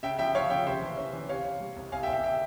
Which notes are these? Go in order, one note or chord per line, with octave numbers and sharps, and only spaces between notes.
C#3 E5 G5
F3 E5 G5
F3 C#5 F5
C#3 E5 G5
C3 C5 E5
E3
C#4
E3
C3 C#5 F5
C3
G3
C2
C2 F5 G#5
E5 G5
C2
E5 G5
E5 G5